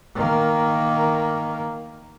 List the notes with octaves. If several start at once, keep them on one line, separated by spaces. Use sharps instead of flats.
D#3 A#3